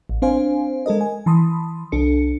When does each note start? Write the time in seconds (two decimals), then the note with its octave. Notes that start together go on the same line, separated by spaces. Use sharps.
0.09 A1
0.22 C4 D4 C5 F5 G#5
0.86 G#3 A4 A#4 D#5
1.01 G#5
1.26 E3 A5 B5 C6 D#6
1.92 C2 D4 A4 C#7